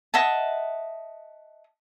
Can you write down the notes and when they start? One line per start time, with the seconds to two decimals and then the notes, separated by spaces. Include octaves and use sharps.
0.14 D#5 E5 F#5 A5